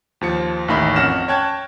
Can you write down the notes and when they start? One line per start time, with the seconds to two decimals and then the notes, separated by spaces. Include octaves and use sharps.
0.21 D#2 F3 C#7
0.68 A1 D#2 D#3 D#4 E5 B5
0.96 F2 C#4 F#5 F6 A#6 E7
1.28 C#5 G5 A5 F#6 G#6